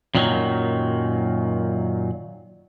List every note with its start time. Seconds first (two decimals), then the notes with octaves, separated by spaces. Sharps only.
0.15 F#2 A#2 D#3 F3 F#3